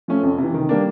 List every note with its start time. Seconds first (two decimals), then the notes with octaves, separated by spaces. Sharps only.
0.08 F3 A3 C#4
0.23 F2
0.38 C3 E3
0.54 D#3
0.69 G3 A#3 D4